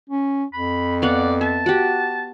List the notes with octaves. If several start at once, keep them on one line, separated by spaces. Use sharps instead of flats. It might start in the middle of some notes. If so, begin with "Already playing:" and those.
C#4
F2 B5
B3 D5 F5 F#5
E5 A5
F#4 G4